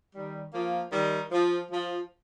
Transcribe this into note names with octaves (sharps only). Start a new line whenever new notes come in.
D#3 G3
F3 A#3
D#3 G3
F3
F3